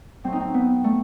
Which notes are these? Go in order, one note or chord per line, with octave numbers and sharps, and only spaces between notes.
A2 F#3 C4
D#4
C4
B3
A3